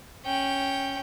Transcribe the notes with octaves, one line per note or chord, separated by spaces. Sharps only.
C#4 G5